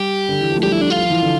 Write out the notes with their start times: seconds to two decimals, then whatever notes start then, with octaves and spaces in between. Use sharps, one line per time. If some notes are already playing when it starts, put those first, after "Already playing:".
Already playing: G3 G4
0.29 D3
0.41 E3
0.52 F3
0.58 A3
0.63 G3 G4
0.72 E4
0.81 D4
0.90 F4
0.99 F3
1.10 E3
1.22 D3